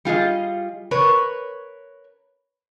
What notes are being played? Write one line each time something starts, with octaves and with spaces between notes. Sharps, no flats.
G3 F4 G#4 D#5
A#4 B4 C#5